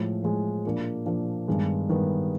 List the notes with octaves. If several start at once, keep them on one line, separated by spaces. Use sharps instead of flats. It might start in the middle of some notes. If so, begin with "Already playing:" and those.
Already playing: A2 F3 G#3
A2 F3 G#3
A#2 F3 A#3 D4
A#2 F3 A#3 D4
G2 D#3 G#3 B3
G2 D#3 G#3 B3